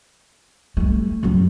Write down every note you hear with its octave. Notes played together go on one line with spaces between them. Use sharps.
G3 A3
F#2 F#3